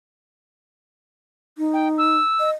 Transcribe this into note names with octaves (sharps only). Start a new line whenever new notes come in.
D#4
G5
E6
D#5